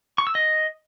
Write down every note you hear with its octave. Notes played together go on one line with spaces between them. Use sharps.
C#6
E6
D#5